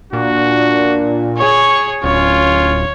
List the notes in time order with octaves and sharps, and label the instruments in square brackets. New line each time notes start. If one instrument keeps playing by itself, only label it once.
[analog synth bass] A#2 [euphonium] D4 [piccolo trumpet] F#4
[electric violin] G#4 C#5 [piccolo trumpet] C#6
[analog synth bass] D1 [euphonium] C#4 [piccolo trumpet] F4 [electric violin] C#5